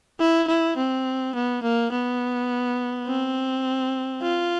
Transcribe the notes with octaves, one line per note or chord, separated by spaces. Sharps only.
E4
E4
C4
B3
A#3
B3
C4
F4